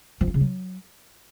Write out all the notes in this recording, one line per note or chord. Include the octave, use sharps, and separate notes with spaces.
F3
F4
C#3
F#3